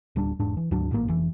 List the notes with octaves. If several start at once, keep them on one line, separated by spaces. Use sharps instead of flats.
D1 G3 D4
E1 G#2 D4
E3
D2 G#2 F#3 D4
A1 G#2 A#3
F1 E3